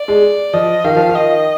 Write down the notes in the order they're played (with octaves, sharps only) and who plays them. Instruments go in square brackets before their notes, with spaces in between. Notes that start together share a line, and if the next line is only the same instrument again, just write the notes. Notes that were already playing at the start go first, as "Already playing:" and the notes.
Already playing: [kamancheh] D5
[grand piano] G#3
[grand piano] F3 [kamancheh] D#5
[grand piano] D#3 [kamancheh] F5
[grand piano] F3
D#3
[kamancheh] D#5